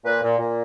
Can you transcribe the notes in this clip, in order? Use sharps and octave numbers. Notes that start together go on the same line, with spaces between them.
A#2 B4
A#2
A#2